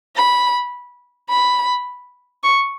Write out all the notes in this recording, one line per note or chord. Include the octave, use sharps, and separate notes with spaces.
B5
B5
C#6